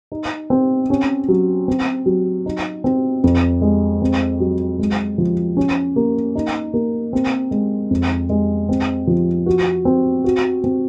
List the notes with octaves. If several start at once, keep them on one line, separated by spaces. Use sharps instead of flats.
D#4
C4
C#4
F#3
C4
F#3
D#4
C4
F2
G#3
C4
F#3
G#3
F3
C#4
A#3
D#4
A#3
C4
G#3
F2
G#3
C4
F3
F#4
C4
F#4
C4